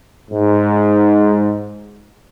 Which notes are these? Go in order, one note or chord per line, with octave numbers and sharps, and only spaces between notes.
G#2